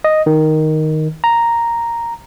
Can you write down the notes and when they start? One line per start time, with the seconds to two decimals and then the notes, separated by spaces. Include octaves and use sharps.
0.04 D#5
0.26 D#3
1.24 A#5